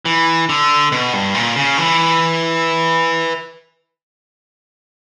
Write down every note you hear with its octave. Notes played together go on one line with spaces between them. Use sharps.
E3
D3
B2
G2
A#2
C#3
E3